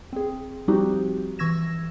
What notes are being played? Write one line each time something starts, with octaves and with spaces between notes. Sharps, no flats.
C4 G#4
F3 G3 C4 D#4 F#4 G4
E3 C#6 E6 G#6 A#6 E7